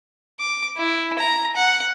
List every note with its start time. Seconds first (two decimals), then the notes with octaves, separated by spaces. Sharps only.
0.40 D6
0.77 E4
1.19 A#5
1.56 F#5